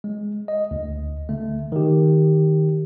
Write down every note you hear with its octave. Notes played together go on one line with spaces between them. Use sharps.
G#3
D#5
D2
D3 A3
D#3 G4